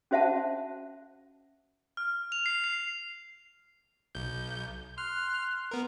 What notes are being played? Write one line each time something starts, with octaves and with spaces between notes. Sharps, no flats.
C#4 F#4 C5 E5 F#5 A5
F6
F7
C7
C7
B1 G6
C6 F6 F#6
B3 A#4